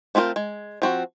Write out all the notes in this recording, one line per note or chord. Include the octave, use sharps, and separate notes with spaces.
A3 C4 F4 G#4 A#4
G#3
F3 C4 F#4